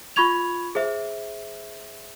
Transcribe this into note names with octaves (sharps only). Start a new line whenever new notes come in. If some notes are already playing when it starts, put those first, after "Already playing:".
F4 B5 C#6 G#6 F7
G#4 C5 E5